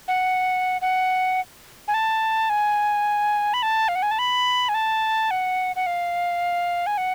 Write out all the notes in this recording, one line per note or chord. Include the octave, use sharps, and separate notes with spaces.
F#5
F#5
G#5
A5
G#5
B5
A5
F5
F#5
G#5
A5
B5
G#5
A5
F#5
F#5
F5
G#5
F#5